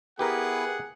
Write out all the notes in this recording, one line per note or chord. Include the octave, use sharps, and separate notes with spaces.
B3 E4 G4 G#4 A#4 B4 F#5